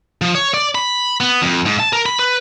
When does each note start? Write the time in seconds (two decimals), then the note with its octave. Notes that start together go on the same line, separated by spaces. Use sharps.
0.22 F3
0.35 C#5
0.54 D5
0.75 B5
1.20 B3
1.42 F2
1.66 G#2
1.80 A5
1.93 A#4
2.06 B5
2.19 B4